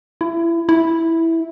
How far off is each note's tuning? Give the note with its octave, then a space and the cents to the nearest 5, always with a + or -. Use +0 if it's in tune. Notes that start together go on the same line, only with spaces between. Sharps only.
E4 +25
E4 -5